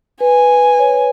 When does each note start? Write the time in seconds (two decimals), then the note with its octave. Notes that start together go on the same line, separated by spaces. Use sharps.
0.20 B4 G#5
0.79 C#5